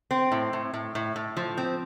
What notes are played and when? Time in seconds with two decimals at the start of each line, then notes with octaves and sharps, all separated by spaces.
0.11 C4
0.32 A2
0.53 A2
0.74 A2
0.95 A2
1.16 A2
1.37 F3
1.57 C4